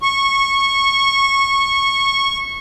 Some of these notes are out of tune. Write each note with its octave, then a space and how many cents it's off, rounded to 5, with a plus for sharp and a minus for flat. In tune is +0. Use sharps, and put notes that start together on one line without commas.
C#6 -15